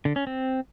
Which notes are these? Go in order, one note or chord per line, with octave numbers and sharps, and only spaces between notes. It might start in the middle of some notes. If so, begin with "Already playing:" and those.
D3
C#4
C4